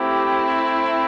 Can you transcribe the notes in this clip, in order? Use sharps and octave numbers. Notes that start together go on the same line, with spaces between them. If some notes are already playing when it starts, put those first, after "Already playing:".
Already playing: A3 C4 E4 G4